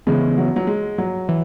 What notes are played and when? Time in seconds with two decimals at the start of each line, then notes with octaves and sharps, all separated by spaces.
0.07 C#3 E3 G#3 B3
0.38 F#3
0.56 F#3
0.67 G#3
0.98 F#3
1.29 E3